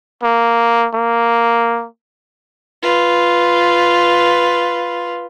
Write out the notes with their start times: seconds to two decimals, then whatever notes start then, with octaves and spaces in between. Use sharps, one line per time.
0.23 A#3
0.94 A#3
2.83 F4 B4